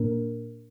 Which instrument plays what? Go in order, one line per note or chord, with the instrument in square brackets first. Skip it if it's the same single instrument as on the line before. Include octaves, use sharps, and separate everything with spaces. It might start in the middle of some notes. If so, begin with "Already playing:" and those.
Already playing: [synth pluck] A#2 A#3 D4 A#4